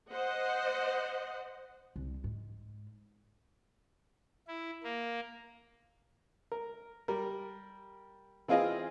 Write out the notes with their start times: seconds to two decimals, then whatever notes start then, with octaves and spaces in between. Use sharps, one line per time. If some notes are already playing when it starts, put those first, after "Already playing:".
0.12 C5 D#5 F#5
1.96 C2
2.24 G#2
4.48 E4
4.84 A#3
6.52 A#4
7.08 G3 A#4
8.48 E3 C4 F4 G#4 D#5 F5